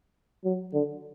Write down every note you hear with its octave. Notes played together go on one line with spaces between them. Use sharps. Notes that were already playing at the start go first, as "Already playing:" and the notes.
F#3
D3